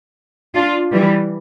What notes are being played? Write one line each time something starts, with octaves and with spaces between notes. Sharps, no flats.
D4 F4
E3 G3